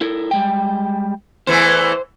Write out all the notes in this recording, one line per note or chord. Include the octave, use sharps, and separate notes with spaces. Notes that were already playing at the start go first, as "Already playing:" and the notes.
E4 A4 A#4
G3 G#3 G5
E2 E3 A3 C5